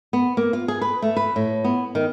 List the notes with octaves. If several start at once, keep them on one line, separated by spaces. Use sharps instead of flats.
B3
A#3
F4
G#4
B4
A3
B4
A2
B3
D#3